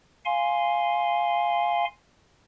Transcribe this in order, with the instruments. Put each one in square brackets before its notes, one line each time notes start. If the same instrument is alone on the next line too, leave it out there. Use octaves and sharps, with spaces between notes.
[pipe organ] F5 G#5 C6